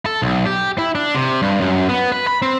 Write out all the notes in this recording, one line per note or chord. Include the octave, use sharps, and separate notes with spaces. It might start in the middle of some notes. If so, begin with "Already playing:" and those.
A4
B1
G4
E4
D4
C3
G2
F#2
B3
B4
B5
C4